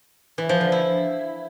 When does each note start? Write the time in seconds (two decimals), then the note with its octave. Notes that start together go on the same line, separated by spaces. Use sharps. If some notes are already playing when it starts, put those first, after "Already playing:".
0.38 E3
0.49 F3
0.61 D3
0.72 E4